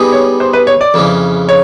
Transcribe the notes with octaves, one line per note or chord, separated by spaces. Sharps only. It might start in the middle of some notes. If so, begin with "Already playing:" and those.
Already playing: G3 B3 D#4 G#4
C#5
C5
B4
C#5
D5
F2 C#3 E3
C#5